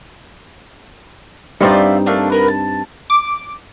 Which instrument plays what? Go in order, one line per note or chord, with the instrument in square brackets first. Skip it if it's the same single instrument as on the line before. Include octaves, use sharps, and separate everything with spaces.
[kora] G2 C4 D#4 [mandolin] F4 D5 E5
[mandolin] A3 A#3 D4
B3 A#4 B4
A5
[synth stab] D6